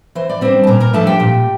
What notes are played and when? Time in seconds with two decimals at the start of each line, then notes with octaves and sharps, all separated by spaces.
0.15 E3 C5
0.29 D5
0.41 G3 C4 D4 C5
0.63 A5
0.67 A#2 A#4 A#5
0.80 A#4 A#5
0.93 F3 A3 D4 A4 A5
1.07 G4 G5
1.20 A#2